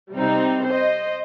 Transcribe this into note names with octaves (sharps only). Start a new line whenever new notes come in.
C3 G3 C4 D#4
C5 D#5